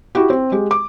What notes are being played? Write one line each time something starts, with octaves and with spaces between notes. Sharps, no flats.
E4 F#4 G4
C4
G#3 G4
D6